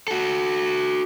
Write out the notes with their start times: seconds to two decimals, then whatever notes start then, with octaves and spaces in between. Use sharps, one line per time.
0.08 F#4 A4